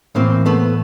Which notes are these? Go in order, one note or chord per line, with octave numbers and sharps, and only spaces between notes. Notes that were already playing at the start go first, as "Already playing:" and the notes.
A2 E3 A#3 C4
A3 B3